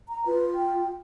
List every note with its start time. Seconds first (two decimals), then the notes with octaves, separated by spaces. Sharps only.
0.09 A#5
0.26 F4 B4
0.55 G5